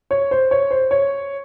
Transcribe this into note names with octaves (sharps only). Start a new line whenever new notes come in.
C#5
C5
C#5
C5
C#5